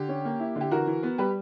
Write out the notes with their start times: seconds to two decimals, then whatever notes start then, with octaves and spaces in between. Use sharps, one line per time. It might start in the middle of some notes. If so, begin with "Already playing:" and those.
Already playing: D3 G4
0.09 C#4
0.25 A#3
0.40 E4
0.56 D3
0.61 G4
0.71 E3 F#4 A#4
0.87 E3
1.03 B3
1.18 G3 G4 B4